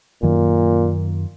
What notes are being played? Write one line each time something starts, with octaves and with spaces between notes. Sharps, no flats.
F#2 A#2 D#3